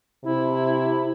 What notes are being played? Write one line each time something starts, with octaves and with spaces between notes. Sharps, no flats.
C3 E4